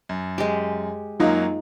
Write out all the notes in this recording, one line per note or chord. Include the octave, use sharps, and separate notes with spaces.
F#2
G#3 G4
F#2 F#3 A#3 D#4 F4